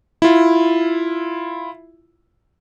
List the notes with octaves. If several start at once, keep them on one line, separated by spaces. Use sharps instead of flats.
E4 F4